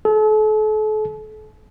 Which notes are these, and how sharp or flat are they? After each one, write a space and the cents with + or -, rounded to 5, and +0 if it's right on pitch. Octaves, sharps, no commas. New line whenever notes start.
A4 -40